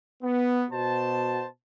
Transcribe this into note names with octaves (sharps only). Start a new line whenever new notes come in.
B3
B2 F#4 C5 A5